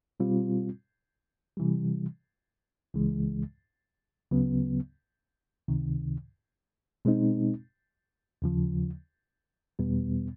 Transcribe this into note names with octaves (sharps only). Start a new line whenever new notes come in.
B2 G3 C4 F4
C3 E3 G3
C#2 C#3 E3 G#3
D2 C#3 F#3 B3
C#2 C3 D#3
B2 G#3 C4 D#4
D#2 C#3 F3
E2 B2 G3 B3